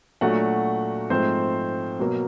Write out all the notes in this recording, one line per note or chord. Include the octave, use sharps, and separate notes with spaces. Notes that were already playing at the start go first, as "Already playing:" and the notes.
A#2 F#3 A3 D4 F#4 F#5
G#2 F3 A3 C4 C5
B2 F#3 A#3